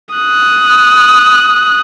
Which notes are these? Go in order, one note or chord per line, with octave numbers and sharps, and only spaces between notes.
D#6 F#6